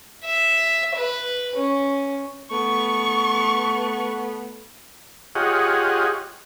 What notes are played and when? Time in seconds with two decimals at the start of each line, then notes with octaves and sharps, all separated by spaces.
0.25 E5
0.95 B4
1.56 C#4
2.51 A3 B3 C#6
5.35 F4 G4 G#4 C#5 D#5 F#5